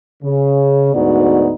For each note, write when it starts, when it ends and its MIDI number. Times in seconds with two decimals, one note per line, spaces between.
0.23 0.91 49
0.94 1.52 38
0.94 1.52 44
0.94 1.52 59
0.94 1.52 63
0.94 1.52 66
0.94 1.52 74